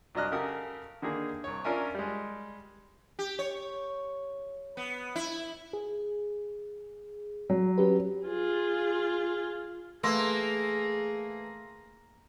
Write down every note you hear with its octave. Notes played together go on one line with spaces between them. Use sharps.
C2 F#3 D4 D#5 F6 F#6
C#3 G4 A4 A#4 F#5 D#6
D3 D#3 A#3 G#4
C2 C#5
C#4 D4 F4 A#4 E5 G#5
G3 G#3
G4
C#5
B3
E4
G#4
F#3
C#4 G4 B4
F4 G#4
E3 A3 A#3 G#4 C6 E6 A#6